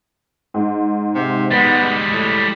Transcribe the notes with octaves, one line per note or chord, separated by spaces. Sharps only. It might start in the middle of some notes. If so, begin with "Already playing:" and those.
G#2
C3
G3 G#3 B3
A2